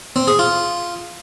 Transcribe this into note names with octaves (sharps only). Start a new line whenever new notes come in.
C4
G#4
F4